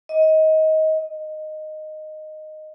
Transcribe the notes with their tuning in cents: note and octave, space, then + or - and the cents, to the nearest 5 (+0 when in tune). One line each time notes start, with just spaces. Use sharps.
D#5 +20
D#5 -10